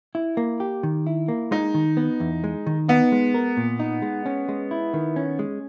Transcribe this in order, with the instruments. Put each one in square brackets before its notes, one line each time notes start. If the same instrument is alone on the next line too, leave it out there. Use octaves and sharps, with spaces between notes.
[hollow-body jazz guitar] E4
A#3
G4
D#3
E4
A#3
[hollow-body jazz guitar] G#3 [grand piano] D#4
[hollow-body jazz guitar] D#3
B3
E2
G#3
D#3
[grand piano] B3 [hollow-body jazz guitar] D#4
[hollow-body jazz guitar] G#3
A#4
A#2
D#4
G#3
C#4
G#3
E4
D#3
C#4
G#3